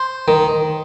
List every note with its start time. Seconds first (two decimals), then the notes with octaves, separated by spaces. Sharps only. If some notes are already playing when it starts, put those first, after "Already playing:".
Already playing: C5
0.28 D#3